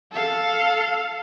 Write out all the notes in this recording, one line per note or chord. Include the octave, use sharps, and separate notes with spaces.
A4 F5